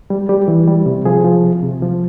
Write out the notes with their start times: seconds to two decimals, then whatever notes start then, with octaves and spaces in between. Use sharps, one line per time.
0.10 G3
0.29 G3 G4
0.48 E3
0.68 G3
0.86 C3
1.05 F3 G#4
1.24 F3
1.43 C3
1.63 C3
1.82 F3